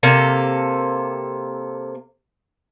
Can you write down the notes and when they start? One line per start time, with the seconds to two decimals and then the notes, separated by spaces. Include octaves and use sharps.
0.03 C3 A#3 A4 F5